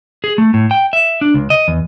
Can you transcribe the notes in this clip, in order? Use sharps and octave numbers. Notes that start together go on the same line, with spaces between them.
G#4
A3
A2
G5
E5
D4
C#2
D#5
E2